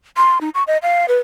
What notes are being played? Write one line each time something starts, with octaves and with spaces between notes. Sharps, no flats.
C6
D#4
C#6
D#5
F5
B4